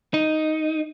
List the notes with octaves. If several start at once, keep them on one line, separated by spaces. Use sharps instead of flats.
D#4